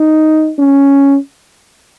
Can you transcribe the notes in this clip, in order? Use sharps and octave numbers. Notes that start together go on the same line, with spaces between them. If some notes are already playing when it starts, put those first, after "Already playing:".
Already playing: D#4
C#4